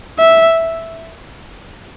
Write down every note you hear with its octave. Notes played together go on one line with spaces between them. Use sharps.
E5